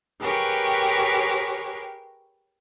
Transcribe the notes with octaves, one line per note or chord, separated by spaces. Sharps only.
G4 G#4 A#4 B4 C#5 C#6